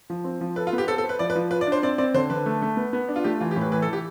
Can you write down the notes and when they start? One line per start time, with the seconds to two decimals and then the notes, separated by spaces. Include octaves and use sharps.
0.10 F3
0.24 C4
0.41 F3
0.56 A4 B4
0.67 F4
0.73 B3
0.78 G4
0.88 A4 C5
0.98 A4
1.04 C5
1.09 B4
1.19 F3 D5
1.30 B4
1.35 F3
1.51 F4 B4
1.61 D5
1.67 D4
1.72 C5
1.83 C4 D5
1.98 C4 D5
2.14 D3 C5
2.30 D3 B4
2.46 A3
2.62 A3
2.77 B3
2.93 B3
3.08 D4
3.16 F4
3.24 A3 G4
3.40 E3 F4
3.51 G4
3.56 A2
3.61 B4
3.72 E3 B4
3.82 A4
3.88 E3 G4